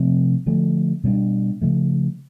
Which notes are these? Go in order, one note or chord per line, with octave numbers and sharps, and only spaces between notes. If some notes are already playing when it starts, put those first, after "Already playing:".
Already playing: C3 F3 A3 C4
D3 F3 A3
B2 G3 B3 D4
C#3 F3 A3